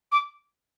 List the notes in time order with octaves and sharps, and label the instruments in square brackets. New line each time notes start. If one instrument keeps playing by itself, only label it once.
[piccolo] D6